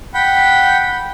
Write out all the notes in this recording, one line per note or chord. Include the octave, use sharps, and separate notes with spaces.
F#5 G5 B5